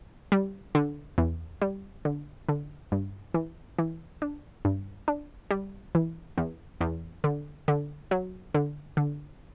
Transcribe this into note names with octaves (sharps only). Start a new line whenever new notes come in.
G3
D3
E2
G3
D3
D3
G2
E3
E3
D4
G2
D4
G3
E3
E2
E2
D3
D3
F#3
D3
D3